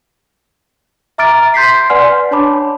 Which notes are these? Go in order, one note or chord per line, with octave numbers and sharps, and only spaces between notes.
E5 A#5 D6 F6 A6 D7
C6 G6 B6 C7
B4 D5 F#5 G#5 C6 F6
D4 C#5 A5 B5 D6